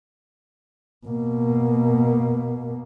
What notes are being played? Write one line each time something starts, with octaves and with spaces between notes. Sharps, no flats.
B2 A#3